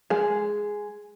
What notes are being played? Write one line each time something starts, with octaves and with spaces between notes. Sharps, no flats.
G#3 G#4